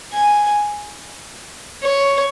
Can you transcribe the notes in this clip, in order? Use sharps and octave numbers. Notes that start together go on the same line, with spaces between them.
G#5
C#5